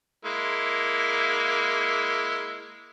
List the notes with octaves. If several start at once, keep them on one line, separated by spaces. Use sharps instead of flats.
G#3 A#3 E4